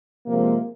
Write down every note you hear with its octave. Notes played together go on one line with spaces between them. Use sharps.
C3 F3 G#3 A#3